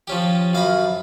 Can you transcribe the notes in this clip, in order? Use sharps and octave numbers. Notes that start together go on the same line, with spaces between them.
F3 C#4 G4
F#2 F5 A#5 B5